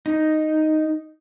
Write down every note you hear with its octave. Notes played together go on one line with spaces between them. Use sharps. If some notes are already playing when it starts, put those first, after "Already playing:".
D#4